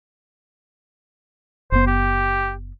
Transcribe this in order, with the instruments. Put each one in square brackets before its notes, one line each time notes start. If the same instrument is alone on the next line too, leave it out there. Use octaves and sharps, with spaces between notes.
[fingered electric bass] F#1 B3 [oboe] C5
[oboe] G4